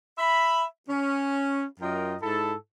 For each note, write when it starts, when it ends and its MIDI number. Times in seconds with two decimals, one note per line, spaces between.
0.18 0.63 76
0.18 0.63 83
0.89 1.65 61
1.80 2.15 42
1.80 2.15 65
1.80 2.15 70
1.80 2.15 75
1.80 2.15 79
2.21 2.53 44
2.21 2.53 64
2.21 2.53 69